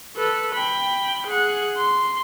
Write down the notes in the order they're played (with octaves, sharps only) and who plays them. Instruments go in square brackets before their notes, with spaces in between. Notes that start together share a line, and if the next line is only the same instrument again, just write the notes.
[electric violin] A4 B4
G5 B5
G#4 F#5
C6